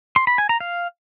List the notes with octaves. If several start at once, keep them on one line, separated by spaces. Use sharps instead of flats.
C6
B5
G#5
A#5
F5